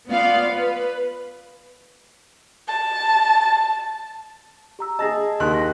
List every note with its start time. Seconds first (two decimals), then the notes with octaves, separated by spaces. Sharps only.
0.11 B3 F4 D5 F5
0.51 B4
2.68 A5
4.79 G4 A#5 E6
4.99 G#4 D#5 A5 A#6
5.40 D#2 C6 F#6
5.55 A#6